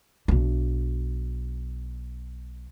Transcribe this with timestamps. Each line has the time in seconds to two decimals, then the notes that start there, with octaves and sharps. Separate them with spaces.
0.28 B1 D4